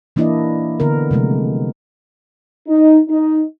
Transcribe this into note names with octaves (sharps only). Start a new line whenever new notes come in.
E3 A#3 D4 E4 D5 D#5
D3 B3 A#4
C3 F3 G#3 A3
D#4
D#4